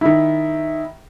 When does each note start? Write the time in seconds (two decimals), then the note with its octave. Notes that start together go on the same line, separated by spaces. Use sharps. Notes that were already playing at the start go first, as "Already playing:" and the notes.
0.01 D#3 E4